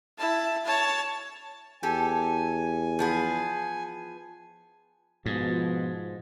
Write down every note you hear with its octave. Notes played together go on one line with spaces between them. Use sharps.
E4 A5
C#5 A5
E2 G4 A4 G#5
F3 B3 G#4
G#2 B2 F3